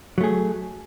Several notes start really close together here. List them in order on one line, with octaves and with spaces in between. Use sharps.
F#3 A3 G#4